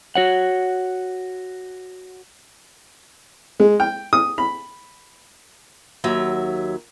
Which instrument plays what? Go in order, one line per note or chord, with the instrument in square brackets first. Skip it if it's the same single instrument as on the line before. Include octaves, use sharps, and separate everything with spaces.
[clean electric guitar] F#4 C#5 F#5
[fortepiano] G#3
G5
D#6
B5
[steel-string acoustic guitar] D#2 F#3 E5